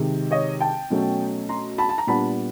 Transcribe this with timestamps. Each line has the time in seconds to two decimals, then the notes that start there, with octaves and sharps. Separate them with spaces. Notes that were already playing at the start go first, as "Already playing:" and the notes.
Already playing: C3 D#3 G#3
0.31 C#5 D#5
0.60 G5 A5
0.90 B2 F#3 A3 C#4
1.49 A#5 C6
1.78 A5 B5
1.89 A5
1.98 A#5
2.07 A#2 G3 B3 D4 A5 B5